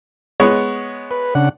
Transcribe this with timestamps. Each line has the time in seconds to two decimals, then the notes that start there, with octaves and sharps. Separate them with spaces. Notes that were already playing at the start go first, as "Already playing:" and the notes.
0.40 G#3 B3 C#5
1.11 B4
1.35 C#3 D4 F#5